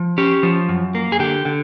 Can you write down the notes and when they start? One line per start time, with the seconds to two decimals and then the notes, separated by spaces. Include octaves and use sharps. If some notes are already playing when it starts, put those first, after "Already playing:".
Already playing: F3
0.18 C#4 G4
0.43 F3
0.69 F#2
0.95 A#3
1.12 G#4
1.19 D3 G4
1.45 D3